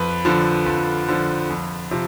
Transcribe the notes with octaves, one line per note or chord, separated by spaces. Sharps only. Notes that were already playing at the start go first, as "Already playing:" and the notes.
Already playing: F2 B4
D3 F3
F2
D3 F3
F2
C3 F3